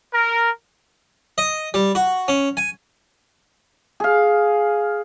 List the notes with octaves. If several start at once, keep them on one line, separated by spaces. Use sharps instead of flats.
A#4
D#5
G3
F#4
C#4
G#5
G#4 F5